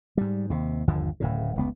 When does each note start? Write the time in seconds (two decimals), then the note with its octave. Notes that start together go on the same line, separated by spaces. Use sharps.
0.17 G#2 G3
0.50 D#2 C3
0.87 G1 D#2 D3 F3
1.20 D1 A2 C#3
1.56 F1 C#2 B3